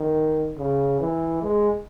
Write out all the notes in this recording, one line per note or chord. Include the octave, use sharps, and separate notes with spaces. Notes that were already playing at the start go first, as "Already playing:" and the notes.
Already playing: D#3
C#3
E3
G#3